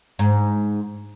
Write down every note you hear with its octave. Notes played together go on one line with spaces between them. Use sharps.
G#2